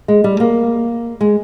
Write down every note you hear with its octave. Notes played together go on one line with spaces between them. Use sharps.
G#3
G3
A#3
G#3